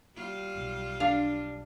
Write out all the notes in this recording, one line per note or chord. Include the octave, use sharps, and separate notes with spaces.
G3 F4
B1
D4 F5